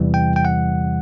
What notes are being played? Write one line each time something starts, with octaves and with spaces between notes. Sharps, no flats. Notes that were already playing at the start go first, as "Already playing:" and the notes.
Already playing: E2 C3 E3 G3
G5
G5
F#5